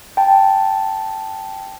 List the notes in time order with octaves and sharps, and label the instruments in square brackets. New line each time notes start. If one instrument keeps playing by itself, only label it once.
[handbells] G5 A5